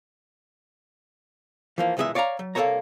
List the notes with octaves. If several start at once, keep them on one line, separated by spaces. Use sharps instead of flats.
E3 F3 A#3
B1 A#2 E3 G#3 G#4 E5
C#5 D5 F5 A5 A#5
F#3
C2 A#3 A4 C5 C#5 A#5